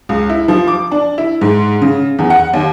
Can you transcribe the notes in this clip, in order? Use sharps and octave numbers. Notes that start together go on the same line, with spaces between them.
C#2
E4
F3
D6
D4
E4
G#2
C#3
E2
F#5
D#2